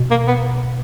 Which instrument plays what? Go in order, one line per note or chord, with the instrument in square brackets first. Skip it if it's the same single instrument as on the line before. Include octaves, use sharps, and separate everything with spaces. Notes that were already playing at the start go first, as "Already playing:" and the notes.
Already playing: [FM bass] B2
[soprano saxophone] A#3
B3